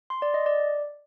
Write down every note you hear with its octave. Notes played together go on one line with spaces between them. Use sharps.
C6
D5
D#5
D5